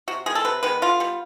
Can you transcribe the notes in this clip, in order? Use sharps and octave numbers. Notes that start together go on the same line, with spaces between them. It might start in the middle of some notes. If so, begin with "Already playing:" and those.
C3 F#4
D#3 G#3 B3 G#4
A4
C3 B4
D#3 G#3 B3 B4
D3 F4
G3 B3